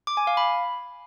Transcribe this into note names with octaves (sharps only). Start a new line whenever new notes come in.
D6
G#5
F5
B5